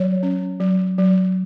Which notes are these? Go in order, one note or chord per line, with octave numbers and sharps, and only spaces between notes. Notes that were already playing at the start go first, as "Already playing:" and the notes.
Already playing: F#3 C#5
C#4
F#3
F#3